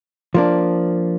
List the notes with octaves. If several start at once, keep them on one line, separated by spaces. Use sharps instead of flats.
F3 A#3 D4